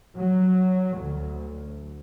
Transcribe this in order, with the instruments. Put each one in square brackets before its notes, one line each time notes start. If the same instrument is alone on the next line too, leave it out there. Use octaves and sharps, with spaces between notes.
[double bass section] F#3
D2